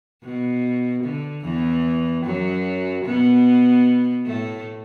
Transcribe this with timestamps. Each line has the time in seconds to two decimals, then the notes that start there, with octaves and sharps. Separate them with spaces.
0.23 B2
1.03 D3
1.44 E2 E3
2.25 F#2 F#3
3.05 B2 B3
4.26 A2 A3